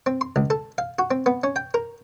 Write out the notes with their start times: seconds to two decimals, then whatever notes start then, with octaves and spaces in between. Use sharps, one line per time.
0.06 C4
0.21 C6
0.36 C#2
0.50 A4
0.78 F5
0.99 F#4
1.11 C4
1.26 B3
1.44 C#4
1.56 G5
1.74 A#4